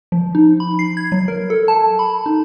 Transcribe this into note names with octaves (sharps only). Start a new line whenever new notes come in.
F3
D#4
B5
C7
G#6
F#3
A#4
A4
A5
B5
D#4